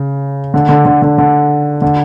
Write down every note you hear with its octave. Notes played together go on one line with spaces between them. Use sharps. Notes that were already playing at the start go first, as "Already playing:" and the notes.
Already playing: C#3
D3
D3
D3
D3
D3
D3